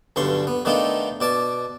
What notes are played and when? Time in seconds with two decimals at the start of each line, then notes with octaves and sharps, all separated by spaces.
0.16 B1 G2 D3 C6 C#6
0.47 B3
0.65 D#3 A3 B3 D4 D#4 F4
1.20 B2 D5 A5